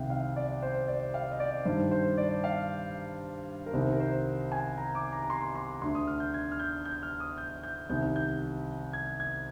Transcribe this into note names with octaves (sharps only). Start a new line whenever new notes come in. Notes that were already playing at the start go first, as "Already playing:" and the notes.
Already playing: C2 C3 D#3 F5 G5
F5
D5
C5
D5
F5
D#5
D5
G2 D#3 C5
C5
D5
F5
A#4
C2 C3 D#3 C5
A#4
C5
G#5
A#5
D6
A#5
A#5
C6
C6
D2 D3 C6
D#6
F6
G6
G#6
F6
G6
G6
F6
D#6
G6
G6
C2 C3 D#3 G6
G6
G#6
G#6